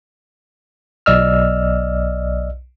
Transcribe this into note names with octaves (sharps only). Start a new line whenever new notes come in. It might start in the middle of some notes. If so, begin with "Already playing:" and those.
B1 D5 D#5 E6 F6